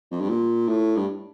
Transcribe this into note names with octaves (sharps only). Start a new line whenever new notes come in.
F2
G2
A#2
A2
G2